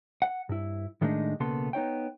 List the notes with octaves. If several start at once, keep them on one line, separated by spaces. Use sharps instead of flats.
F#5
G2 E4
A2 D#3 G#3 A3 D4 D#4
B1 C#3 A#3 B3 A4 C6
B3 D#4 C#5 G5